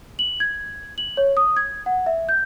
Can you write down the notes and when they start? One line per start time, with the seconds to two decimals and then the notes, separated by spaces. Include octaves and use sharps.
0.19 F#7
0.40 G#6
0.98 F#7
1.17 C#5
1.37 D#6
1.57 G#6
1.86 F#5
2.06 E5
2.29 G6